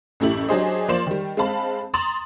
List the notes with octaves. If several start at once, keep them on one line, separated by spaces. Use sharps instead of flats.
A1 F#2 A3 E4 G4 F#7
F#3 D4 G4 G#4 C5 D#5
F3 A#3 C5 D5 C6 E7
D#3 G3
G#3 C4 F5 A5 B5
A#5 C6 D#6 A6 E7 F#7